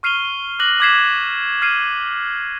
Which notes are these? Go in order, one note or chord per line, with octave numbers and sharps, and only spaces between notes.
C#6 F6 C7 D#7 F7 G7
D6 F#6 A#6 F#7
D6 F#6 G#6 B6 C7 E7
F6 G#6 C7 D#7